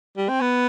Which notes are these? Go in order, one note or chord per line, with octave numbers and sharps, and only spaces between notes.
G3
C4
B3